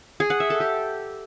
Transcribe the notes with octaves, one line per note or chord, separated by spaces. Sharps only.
G#4
F#5
E5
A4
G4